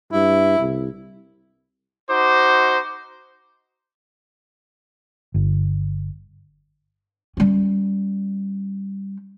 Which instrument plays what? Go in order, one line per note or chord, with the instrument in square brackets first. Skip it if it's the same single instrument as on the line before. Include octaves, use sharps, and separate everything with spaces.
[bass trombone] G2 [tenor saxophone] E4
[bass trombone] C2
[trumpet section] D#4 F#4 C5 D6
[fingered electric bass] G1
[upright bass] G3 C#4